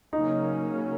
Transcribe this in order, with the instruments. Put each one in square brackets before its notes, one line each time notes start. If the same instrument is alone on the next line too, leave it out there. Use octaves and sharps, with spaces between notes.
[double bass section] C#3 F#3 A#3 C#4 [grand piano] D#4